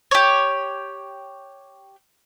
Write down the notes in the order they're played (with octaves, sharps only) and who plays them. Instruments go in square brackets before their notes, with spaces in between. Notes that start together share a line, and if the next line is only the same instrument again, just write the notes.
[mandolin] G4 C#5